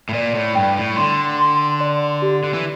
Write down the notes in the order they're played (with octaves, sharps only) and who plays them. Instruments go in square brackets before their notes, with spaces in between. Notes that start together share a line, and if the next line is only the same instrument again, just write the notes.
[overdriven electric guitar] A2
[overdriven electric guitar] A#2 [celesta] D5
[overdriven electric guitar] A2
[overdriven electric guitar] G2 [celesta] G5
[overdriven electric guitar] A2
[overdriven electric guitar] D3 [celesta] C6
[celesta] C6
D5
G4
[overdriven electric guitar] D3
E3